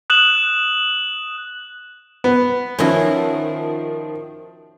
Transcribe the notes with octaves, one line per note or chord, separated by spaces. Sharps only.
D#6 F#6 E7 F#7
B3
D#3 F3 C#4 E4 F#4